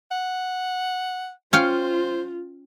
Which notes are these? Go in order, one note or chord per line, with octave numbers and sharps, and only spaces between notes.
F#5
C#4 F4 C5 F5 G5